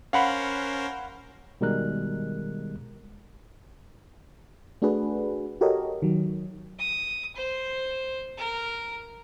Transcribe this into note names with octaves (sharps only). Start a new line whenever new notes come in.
C#4 A#4 C5 F5 F#5 B5
B2 D#3 G3 G#3 A#4 F#6
A3 D4 F#4 G#4 B4
F#4 G4 A4 A#4 C#5 D#5
D#3 F#3
D#6
C5
A#4